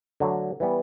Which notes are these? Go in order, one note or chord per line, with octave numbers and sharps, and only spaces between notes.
D3 F#3 A3
E3 G3 B3